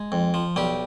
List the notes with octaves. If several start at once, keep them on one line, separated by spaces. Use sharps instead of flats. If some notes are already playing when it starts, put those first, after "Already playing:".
Already playing: G#3
F2
F3
B1 G3 G4